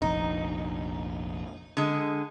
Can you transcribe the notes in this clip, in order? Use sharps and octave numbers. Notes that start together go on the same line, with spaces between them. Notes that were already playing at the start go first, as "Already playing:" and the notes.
F1 A#1 D#4
D3 G#3